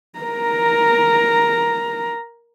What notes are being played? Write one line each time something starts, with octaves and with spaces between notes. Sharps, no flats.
A#4 A#5